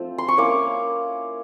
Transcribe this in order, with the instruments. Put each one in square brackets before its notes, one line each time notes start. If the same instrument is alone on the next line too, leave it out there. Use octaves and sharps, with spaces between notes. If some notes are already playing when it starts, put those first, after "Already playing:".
Already playing: [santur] F3 A3 C4
C6
C#6
A#3 C#4 E4 D6